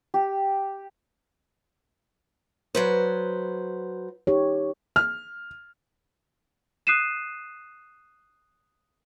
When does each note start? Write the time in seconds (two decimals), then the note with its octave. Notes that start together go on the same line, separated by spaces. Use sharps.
0.14 G4
2.75 F#3 B4 C5
4.27 D#4 G4 C#5
4.96 F6
6.87 D#6 F#6 C7 D#7 E7